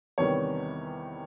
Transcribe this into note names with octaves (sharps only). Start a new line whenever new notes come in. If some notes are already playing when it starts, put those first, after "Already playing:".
E2 C3 D#3 G3 B3 C#5